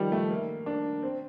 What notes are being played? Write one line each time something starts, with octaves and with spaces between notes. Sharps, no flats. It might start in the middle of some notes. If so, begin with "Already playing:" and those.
Already playing: D#3 F3 G3
A3
A#3
D4
C4